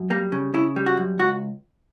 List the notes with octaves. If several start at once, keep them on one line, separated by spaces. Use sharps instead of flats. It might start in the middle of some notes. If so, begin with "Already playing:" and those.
Already playing: F#2
G3 A#3
C#3
C#3 E4
G3
F#4
F#2
C#2 F#4